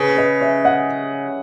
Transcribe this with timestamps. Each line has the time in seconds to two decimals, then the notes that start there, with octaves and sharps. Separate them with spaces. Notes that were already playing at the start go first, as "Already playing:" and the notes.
Already playing: C#3 G#4 B4
0.17 B4 D#5
0.41 C#5 E5
0.65 D#5 F#5